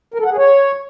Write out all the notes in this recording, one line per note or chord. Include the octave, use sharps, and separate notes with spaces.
A#4
A4
F#5
G#4
C#5